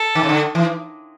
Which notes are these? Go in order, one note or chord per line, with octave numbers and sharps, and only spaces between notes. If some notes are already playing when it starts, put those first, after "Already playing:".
Already playing: A4
D#3
C#3
D3
E3